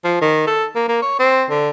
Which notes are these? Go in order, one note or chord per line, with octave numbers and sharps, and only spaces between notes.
F3
D#3
A4
A#3
A#3
C#5
C4
D3